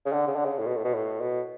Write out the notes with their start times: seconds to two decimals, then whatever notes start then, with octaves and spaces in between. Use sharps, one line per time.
0.06 C#3
0.13 D3
0.27 C#3
0.36 D3
0.45 C#3
0.58 A2
0.67 B2
0.77 A2
0.85 B2
0.94 A2
1.21 B2